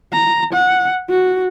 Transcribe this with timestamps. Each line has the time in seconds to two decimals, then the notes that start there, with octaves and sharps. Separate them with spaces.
0.13 A#5
0.53 F#5
1.10 F#4